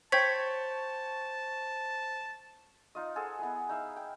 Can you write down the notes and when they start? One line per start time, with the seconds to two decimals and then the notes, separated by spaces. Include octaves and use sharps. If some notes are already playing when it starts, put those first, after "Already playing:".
0.12 C5 C#5 G5 A5 G#6 B6
2.95 D#4 F4 D#5
3.16 G#4 A4 C5 F#5
3.39 B3 E4 G#4
3.69 D#4 E5 F5
3.96 G5